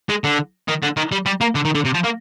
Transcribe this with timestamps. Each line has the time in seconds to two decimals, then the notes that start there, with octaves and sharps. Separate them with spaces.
0.09 G#3
0.24 D3
0.68 D#3
0.83 D3
0.97 D#3
1.12 G3
1.26 G3
1.41 A#3
1.55 D3
1.65 D#3
1.75 D3
1.85 C3
1.94 F3
2.04 A#3